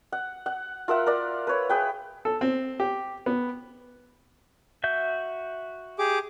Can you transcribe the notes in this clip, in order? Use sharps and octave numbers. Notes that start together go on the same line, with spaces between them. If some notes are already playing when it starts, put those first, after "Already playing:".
F#5
F#5
F4 A#4 E5 F#5
A#4 D5
B4 C#5
G#4 B4 G5
A4
C4
G4
B3
F#4 E5 G6
G4 G#4 D6